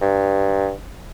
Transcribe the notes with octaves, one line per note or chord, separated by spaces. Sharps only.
G2